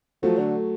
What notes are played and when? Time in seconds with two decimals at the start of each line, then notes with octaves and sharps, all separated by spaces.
0.23 F3 F#3 A3
0.39 D3